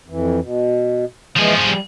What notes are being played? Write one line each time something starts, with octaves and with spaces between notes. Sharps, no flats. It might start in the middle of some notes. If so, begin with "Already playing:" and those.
F2 E3
B2
E3 F3 G#3 G#4
G3